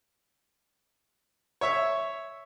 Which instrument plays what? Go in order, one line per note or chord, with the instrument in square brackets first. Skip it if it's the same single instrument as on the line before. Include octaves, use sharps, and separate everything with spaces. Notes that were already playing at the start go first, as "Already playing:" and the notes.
[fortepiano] C#5 E5